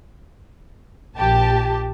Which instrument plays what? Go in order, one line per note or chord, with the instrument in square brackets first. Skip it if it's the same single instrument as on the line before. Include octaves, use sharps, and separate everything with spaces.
[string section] A#1 G4 A5